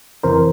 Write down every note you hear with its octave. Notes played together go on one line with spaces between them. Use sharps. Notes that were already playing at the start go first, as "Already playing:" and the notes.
F2 C3 E3 A#4 C5